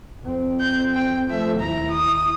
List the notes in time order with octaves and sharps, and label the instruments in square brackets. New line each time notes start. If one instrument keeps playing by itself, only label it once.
[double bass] F2 C4
[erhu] G6
G5
[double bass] F3 A3 [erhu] E5
[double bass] D#2 E4 [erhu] A#5
[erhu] D#6